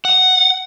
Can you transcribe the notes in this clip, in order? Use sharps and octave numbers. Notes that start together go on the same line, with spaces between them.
F#5